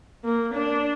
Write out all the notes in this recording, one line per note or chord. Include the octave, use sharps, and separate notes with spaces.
A#3
D4